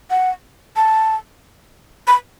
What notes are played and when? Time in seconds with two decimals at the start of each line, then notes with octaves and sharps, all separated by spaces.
0.10 F#5
0.76 A5
2.08 B5